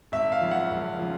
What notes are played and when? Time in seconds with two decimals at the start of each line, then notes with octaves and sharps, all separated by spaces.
0.12 G#1 E5
0.32 F5
0.41 F#2 C#3 F3
0.51 F#5
0.71 G#1
0.99 C#3 F3